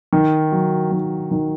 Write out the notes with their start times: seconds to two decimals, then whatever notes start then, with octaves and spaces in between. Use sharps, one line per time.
0.13 D#3
0.52 F#3
0.92 D#3
1.31 D#3